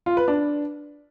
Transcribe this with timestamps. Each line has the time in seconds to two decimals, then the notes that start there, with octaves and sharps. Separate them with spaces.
0.06 F4
0.17 B4
0.28 D4